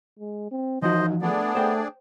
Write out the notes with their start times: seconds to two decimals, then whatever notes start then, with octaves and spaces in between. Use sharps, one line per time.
0.19 G#3
0.51 C4
0.82 F#2 E3 F3 D#4 F#4 C5 D#5
1.22 A3 B3 D4 G#4 D5
1.55 A3 C5 G5